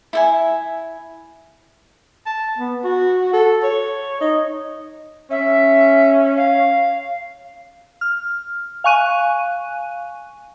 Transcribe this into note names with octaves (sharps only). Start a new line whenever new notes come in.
E4 E5 G#5
A5
B3
F#4
A4
C#5
D#4
C#4 E5
F5
F6
F5 G#5 C#6 F#6 D#7